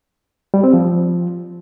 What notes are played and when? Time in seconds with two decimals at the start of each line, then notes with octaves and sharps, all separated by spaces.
0.54 G3
0.64 C4
0.73 F3